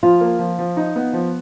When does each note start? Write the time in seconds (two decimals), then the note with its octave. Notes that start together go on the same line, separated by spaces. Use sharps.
0.03 F3 F4
0.21 A#3
0.39 F3
0.59 F3
0.77 D#4
0.96 B3
1.13 F3